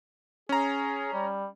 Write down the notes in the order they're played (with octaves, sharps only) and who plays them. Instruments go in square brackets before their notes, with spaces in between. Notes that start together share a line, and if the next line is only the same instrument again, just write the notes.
[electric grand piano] C#4 A#5 [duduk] G#4
[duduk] G3